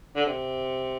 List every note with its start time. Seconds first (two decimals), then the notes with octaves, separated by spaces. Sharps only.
0.16 D3
0.26 C3